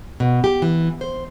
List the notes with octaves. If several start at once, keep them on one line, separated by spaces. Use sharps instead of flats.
B2
G4
E3
C5